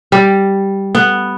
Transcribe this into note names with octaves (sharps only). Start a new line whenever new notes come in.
G3
B3